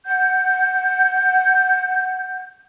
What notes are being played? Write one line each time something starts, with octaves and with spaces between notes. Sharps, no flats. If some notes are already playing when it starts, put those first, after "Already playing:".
F#5 G6